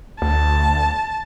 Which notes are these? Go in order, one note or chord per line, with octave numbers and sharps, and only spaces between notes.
D2 A5